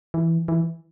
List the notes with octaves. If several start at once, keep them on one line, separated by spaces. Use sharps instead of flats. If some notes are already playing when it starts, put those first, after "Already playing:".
E3
E3